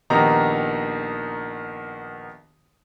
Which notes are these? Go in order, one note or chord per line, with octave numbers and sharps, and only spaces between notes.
A#1 D#3 B3 D#4 G4 A#5